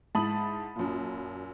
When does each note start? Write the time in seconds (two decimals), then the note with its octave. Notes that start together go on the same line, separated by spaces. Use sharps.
0.15 G#2 E4 A5 B5 D#6 F#7
0.76 F#2 A#2